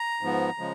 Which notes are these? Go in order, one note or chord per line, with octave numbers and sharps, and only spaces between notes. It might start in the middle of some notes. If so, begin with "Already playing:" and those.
Already playing: A#5
G#2 F3 B3
C#3 F3 G#3